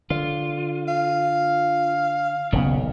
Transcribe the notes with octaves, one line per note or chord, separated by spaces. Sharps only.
D3 F4
F5
D#1 B1 C#3 B3